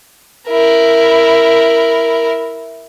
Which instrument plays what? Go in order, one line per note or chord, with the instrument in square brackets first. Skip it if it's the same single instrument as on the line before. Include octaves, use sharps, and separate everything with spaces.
[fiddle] E4 A#4